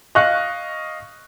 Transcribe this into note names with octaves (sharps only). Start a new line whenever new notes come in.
D#5 F5 C#6 F#6